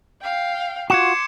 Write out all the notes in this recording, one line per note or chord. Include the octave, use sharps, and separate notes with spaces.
F5 G5
F4 F#4 C6 D6 G#6 C#7 E7